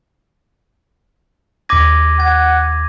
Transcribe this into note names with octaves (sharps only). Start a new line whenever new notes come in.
D#2 D6 G#6 A#6 B6 D#7
F#5 G#6